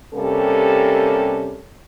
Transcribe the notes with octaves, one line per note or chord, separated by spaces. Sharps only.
C3 G3 A#3 C#4 A4